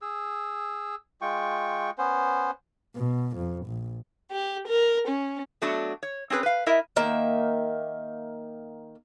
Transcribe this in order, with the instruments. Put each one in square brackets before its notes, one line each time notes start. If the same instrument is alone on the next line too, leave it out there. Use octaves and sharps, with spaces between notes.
[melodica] G#4 E6
G#3 F4 G5 C#6
B3 C#4 C5
[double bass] B2
F2
A#1
[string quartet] G4
A#4
C#4
[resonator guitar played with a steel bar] F#3 A3 B3 D4 F#4
C#5
C4 C#4 G#4 B4
B4 F5
E4 A#4 D#5 E5
[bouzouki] D#3 A#3 E5